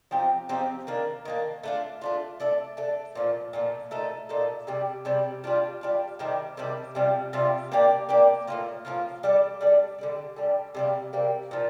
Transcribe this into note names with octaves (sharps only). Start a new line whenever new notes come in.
F3 C4 D#4 G4
F3 C4 D#4 G4
D#3 A#3 D4
D#3 A#3 D4
A3 D4 F4
A3 D4 F4
A3 D4 A4
A3 D4 A4
A#2 F3 A3
A#2 F3 A3
A#2 A3 D#4 A4
A#2 A3 D#4 A4
C3 G3 D4
C3 G3 D4
G3 D4 F4
G3 D4 F4
C3 D#3 G3 D4
C3 D#3 G3 D4
C3 G3 D4 F4
C3 G3 D4 F4
A#3 D4 G4 D5
A#3 D4 G4 D5
A2 F3 A#3 F4
A2 F3 A#3 F4
G3 D4 A4 D5
G3 D4 A4 D5
D3 G3 D4
D3 G3 D4
C3 G3 A#3
C3 G3 A#3
A#2 F3